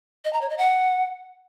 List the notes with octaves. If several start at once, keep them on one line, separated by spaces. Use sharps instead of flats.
D#5
A#5
C#5
D#5
F#5